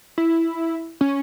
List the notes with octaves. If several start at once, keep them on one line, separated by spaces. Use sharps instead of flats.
E4
C#4